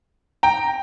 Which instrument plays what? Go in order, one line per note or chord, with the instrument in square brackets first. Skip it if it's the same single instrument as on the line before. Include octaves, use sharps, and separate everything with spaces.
[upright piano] G5 A#5